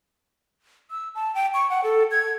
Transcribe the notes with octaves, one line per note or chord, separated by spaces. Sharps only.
E6
A5
G5
C#6
F#5
A4
G#6